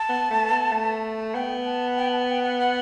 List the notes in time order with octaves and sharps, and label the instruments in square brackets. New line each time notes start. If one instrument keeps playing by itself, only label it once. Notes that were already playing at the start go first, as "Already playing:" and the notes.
Already playing: [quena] A5
[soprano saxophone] B3
A3
B3
A3
[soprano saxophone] B3 [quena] G5
[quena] A5
G5
A5
G5
F#5
F#5